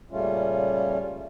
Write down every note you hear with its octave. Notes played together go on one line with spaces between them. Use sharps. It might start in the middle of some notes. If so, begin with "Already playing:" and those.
A#2 C#3 G3 A3 C#4 F4